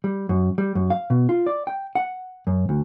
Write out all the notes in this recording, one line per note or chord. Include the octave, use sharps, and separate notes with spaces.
G3
F#2
G3
F#2
F5
B2
F4
D5
G5
F#5
F#2
D2